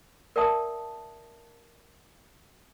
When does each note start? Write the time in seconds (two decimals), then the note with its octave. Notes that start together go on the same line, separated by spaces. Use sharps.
0.36 A#4 D5 E5 F#5 A5 D#6